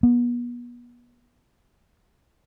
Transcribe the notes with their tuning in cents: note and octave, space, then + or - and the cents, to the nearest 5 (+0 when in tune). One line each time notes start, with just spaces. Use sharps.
B3 -35